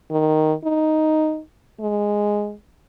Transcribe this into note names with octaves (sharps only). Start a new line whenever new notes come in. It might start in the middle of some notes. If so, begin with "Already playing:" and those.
D#3
D#4
G#3